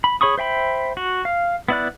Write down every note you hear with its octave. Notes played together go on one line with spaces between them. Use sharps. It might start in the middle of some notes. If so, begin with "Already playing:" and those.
B5
G#4 C#5 B5 C#6 D#6
C5 E5 G5 B5
F#4
F5
B3 E4 D5 F#6